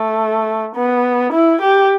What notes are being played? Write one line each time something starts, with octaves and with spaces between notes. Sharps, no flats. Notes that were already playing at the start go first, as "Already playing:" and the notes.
Already playing: A3
B3
E4
G4